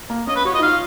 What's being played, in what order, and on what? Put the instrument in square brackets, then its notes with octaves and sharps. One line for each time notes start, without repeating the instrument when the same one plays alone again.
[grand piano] A#3
[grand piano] C#4 [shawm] D#5
[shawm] B4
[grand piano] F#4 [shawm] C#5
[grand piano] F4 [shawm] D#5
[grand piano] D#4
[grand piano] F4 [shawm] F5